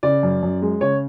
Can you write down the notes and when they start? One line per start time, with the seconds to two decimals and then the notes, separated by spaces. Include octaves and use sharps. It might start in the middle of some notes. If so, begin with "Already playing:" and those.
0.03 C#3 D5
0.23 F#2
0.43 F#2
0.62 G#3
0.81 C#3 C#5